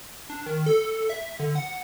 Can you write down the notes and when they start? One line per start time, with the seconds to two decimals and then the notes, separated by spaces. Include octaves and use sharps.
0.30 D4
0.46 D#3
0.66 A4
1.10 E5
1.40 D3
1.55 F#5